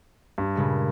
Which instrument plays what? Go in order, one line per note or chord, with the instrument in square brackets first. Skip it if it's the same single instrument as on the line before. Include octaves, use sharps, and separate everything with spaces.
[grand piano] G2
[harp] A#2 C#3 G#3